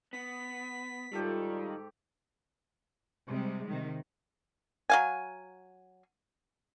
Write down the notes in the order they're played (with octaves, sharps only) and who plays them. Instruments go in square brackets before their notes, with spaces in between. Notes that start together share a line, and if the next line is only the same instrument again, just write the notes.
[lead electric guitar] B3 [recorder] B6
[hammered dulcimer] G#2 G4 A4 [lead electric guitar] D#3 [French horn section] G3 F4
[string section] C3 G3 G#3
C3 D#3
[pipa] F#3 F5 G#5